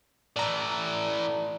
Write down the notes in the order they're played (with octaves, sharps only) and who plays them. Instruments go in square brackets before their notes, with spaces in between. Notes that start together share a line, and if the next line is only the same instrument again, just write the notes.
[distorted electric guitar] A2 E3 [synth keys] D5 A#5